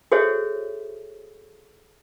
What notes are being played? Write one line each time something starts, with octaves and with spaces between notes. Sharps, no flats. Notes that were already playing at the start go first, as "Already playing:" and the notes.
F#4 G#4 A4 C5 C#5 E5